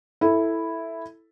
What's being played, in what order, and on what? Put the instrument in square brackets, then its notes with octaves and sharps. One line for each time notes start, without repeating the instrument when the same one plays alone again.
[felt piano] E4 A4